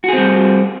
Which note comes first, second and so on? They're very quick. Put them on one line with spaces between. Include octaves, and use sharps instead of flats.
F#4 G#4 C4 G3